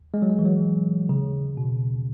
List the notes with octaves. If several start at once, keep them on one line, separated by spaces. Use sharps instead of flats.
G#3
F#3
G#3
E3
F#3
C#3
B2